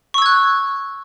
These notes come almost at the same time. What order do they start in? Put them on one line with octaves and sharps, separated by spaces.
C#6 E6 G#6 F#6